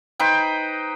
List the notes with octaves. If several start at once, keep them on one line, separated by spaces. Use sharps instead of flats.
D#4 B4 C5 G5